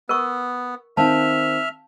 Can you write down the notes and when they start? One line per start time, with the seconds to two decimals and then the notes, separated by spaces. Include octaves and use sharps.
0.09 B3 A#4 C#6
0.97 D#3 C4 E5 F5 A5 F6